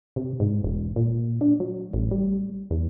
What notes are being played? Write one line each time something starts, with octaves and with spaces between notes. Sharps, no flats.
C3
G#2
E1
A#2
D4
F#3
A1
G3
E2